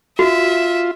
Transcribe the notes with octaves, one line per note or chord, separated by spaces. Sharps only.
F4 F#4 E5